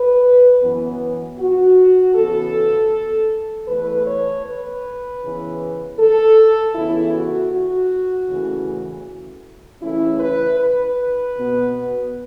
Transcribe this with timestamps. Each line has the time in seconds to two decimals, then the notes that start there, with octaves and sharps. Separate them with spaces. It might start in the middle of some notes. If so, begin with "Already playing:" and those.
Already playing: B4
0.62 F#2 E3 B3
1.38 F#4
2.15 C#3 E3 B3 A4
3.68 E2 E3 A3 B4
4.07 C#5
4.45 B4
5.22 C#3 E3 B3
5.98 A4
6.75 C#3 E3 B3 E4
7.14 F#4
7.52 F#4
8.29 E2 C#3 E3 A3 C#4
9.81 C#3 E3 A3 C#4 E4
10.20 B4
10.59 B4
11.35 B2 B3